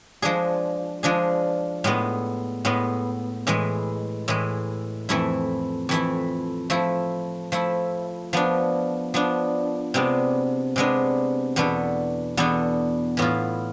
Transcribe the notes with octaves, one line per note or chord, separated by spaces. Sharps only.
F3 G#3 D4 G#4
F3 G#3 D4 G#4
A2 G#3 B3
A2 G#3 B3
A2 E3 G#3
A2 E3 G#3
F2 E3 A3 E4
F2 E3 A3 E4
F3 A3 E4
F3 A3 E4
F3 B3 D4
F3 B3 D4
C3 G#3 B3 D4
C3 G#3 B3 D4
E2 B2 B3 D4 A4
E2 B2 B3 D4 A4
A2 E3 B3 F4